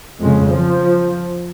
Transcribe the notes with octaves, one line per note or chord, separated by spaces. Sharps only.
F2 C#3 G#3
F3